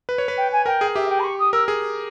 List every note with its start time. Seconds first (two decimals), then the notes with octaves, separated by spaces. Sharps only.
0.09 B4
0.18 C#5
0.28 B4
0.37 G5
0.52 G#5
0.66 A#4 G5
0.81 G#4
0.96 G4 E5
1.09 G5
1.19 B5
1.24 C#6
1.39 D#6
1.53 A#4 E6
1.68 G#4